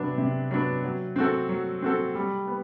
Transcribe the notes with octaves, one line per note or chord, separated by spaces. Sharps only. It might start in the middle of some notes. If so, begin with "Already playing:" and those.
Already playing: C3 F#3 B3 D4
C3
F#3 B3 D4
F#3
C4 F#4 A4
F#3
C4 F#4 A4
G3
B3